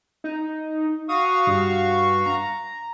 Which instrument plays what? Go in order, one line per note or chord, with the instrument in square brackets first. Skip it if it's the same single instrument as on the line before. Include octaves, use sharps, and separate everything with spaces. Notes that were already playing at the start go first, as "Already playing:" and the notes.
[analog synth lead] D#4
[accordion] F#4 F5 C#6 [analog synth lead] D#6
[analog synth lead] G2
A#5